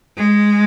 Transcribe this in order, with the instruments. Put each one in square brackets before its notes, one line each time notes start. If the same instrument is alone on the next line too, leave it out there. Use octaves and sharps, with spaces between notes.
[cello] G#3